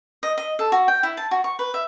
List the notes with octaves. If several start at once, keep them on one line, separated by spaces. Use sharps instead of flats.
D#5
D#5
A4
F#4
G5
E4
A5
F#4
C#6
B4
E5